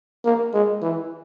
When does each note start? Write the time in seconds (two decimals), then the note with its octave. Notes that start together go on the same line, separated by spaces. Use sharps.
0.25 A#3
0.54 G#3
0.82 E3